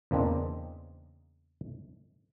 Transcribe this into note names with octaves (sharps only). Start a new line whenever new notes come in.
E2 C#3 A#3 C4 D4 D#5